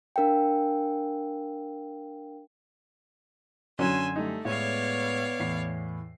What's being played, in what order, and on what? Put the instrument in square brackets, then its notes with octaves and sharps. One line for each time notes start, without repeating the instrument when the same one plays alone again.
[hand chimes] D4 A#4 F5 G5
[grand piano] F#2 D3 [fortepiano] F#3 C#4 [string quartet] G#5 C6 E6
[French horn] G3 [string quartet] A3 [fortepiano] D#4
[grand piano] A2 G#3 [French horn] B3 [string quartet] C#5 D5 F5
[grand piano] E2 A2 C7